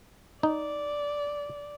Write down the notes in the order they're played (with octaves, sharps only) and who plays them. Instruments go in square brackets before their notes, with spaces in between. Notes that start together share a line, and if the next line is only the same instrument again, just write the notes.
[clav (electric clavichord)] D#4 [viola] D5